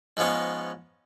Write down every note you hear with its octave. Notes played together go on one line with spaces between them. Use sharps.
G#2 F3 G#3 B3 C#4